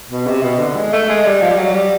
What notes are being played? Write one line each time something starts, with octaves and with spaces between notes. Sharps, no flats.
B2
C3
B2
D3
G#3
A3
G#3
G3
F3
G3
F#3
G3